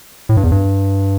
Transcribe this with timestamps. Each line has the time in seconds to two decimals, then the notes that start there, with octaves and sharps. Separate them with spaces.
0.29 A2
0.37 G2
0.44 E2
0.52 G2